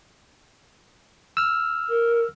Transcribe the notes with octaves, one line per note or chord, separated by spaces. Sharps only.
E6 F6
A#4